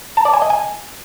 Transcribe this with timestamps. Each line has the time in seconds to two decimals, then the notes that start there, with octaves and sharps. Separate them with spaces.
0.17 A5
0.25 D5
0.34 G#5
0.42 D#5
0.50 G#5